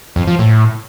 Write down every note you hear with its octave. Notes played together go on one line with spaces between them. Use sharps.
F2
F3
A2